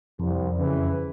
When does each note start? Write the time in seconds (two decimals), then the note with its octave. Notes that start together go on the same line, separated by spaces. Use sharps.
0.20 C2 F2
0.58 C#3 E3